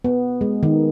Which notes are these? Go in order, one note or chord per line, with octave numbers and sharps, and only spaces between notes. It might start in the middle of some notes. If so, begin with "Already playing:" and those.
B3
G#3
D#3